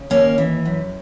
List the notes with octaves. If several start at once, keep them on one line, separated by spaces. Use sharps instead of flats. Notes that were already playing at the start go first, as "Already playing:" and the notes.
Already playing: C#3
D#2 A#3 C#4
E3
F#2